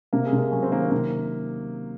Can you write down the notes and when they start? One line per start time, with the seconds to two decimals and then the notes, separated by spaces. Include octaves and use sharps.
0.13 C3 A#3
0.26 G#3
0.33 C3
0.39 A#3
0.52 F#3 C#4
0.63 C4
0.71 D#3 A#3
0.82 C4
0.91 C3 A#3